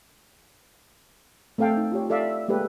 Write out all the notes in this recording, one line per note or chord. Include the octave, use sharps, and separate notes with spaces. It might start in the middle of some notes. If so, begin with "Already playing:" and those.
A3 C4 A4 F5 G5 A5
D#4
F4 G4 C#5
A4 D5 E5 F5
G#3 A#3 G4 A4 B4